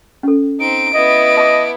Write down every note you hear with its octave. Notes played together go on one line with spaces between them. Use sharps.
C#4 A4
C4 D#4 D7
B3 E4 D#5
D#5 A5 D6